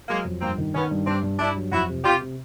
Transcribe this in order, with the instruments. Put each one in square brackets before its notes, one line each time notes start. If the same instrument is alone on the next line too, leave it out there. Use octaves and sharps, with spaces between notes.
[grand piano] F#3 [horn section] G#3 A#3
[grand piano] F2
[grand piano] G2 [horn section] A#3 C4
[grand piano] D#3
[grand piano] D#3 [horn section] B3 C#4
[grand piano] G2
[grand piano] G2 [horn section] C4 D4
[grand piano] G2
[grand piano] G2 [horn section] D4 E4
[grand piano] F#3
[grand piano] F2 [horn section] E4 F#4
[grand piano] C3
[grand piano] C3 [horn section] F4 G4
[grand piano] C3